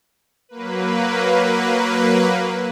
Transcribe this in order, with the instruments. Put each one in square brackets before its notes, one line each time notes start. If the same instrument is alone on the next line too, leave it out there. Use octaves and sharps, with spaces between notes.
[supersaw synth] F#3 A#3 B4